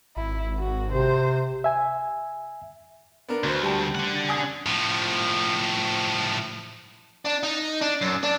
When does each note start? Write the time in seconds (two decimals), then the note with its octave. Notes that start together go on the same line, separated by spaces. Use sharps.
0.16 G#1 E4
0.59 F#4
0.92 C3 C5
1.64 E5 G#5
3.28 B3 D4 A#4
3.44 D2 F#4 B4 C5
3.62 G3 G4 A5
3.95 D4 F#5
4.29 G#5 D#6 G#6
4.67 A2 F3
7.25 D4
7.43 D#4
7.81 D4
8.01 F#2
8.23 D4